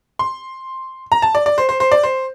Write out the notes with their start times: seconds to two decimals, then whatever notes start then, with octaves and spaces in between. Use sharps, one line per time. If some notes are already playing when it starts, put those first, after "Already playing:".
0.19 C6
1.12 A#5
1.22 A5
1.35 D5
1.46 D5
1.58 C5
1.69 C5
1.80 C5
1.92 D5
2.03 C5